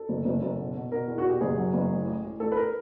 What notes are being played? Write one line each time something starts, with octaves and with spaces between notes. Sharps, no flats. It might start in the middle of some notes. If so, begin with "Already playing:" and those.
Already playing: A4
F#1
F#1
F#1
B2
B2
B2 A#4
E2
F#4
B2
G4
F#1 G#4
F#3
F#1
A1
A1
A1
A1 A4
B4
A#4